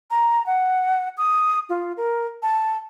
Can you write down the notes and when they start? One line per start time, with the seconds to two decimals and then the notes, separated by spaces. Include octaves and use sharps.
0.10 A#5
0.46 F#5
1.17 D#6
1.69 F4
1.97 A#4
2.42 A5